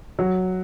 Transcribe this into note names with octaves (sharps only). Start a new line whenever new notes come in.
F#3